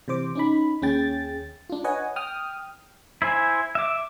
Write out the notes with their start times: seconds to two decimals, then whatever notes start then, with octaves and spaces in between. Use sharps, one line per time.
0.08 C3 E3 C5 D6
0.35 C#4 D#4 B5
0.82 D#2 C#4 G#4 G5 A6
1.70 D4 F4
1.84 B4 C#5 D#5 F#5 G#5
2.16 G5 D#6 F6
3.22 E4 C5 G#5
3.75 E5 D6